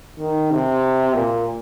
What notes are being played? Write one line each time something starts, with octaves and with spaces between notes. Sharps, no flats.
D#3
C3
A#2